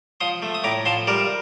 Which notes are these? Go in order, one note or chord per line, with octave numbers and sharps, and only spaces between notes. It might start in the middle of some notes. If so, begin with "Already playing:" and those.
F3 C6 D#6
A3
D#6
A2 A#5 D6
F3 A5 C6
G3 A#4 D5